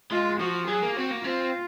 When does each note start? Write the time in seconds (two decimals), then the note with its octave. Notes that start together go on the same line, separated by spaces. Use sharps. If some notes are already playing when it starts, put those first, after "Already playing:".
0.11 G#3 F4
0.40 F3 F#4
0.68 F#3 G#4
0.83 A#3
0.96 C4 F#4
1.10 A#3
1.24 C4 F4